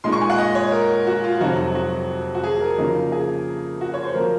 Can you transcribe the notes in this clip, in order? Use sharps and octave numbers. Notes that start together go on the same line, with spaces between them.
A#2 G#3 D#4 C6
C#6
G#5
F#5
D#5
C#5
A#4
F#4
F4
F2 C3 F#3 C4 D#4 F#4
F#4
F#4
G#4
A#4
C#3 F3 A#3 D#4
G#4
F#4
C#5
C5
F3 A#3 A#4